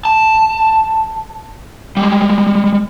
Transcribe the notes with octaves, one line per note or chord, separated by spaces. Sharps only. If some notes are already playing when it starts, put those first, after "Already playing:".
A5
G3 G#3